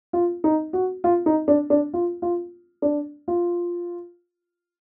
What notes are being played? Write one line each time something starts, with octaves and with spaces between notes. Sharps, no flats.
F4
D#4
F#4
F4
D#4
D4
D4
F4
F4
D4
F4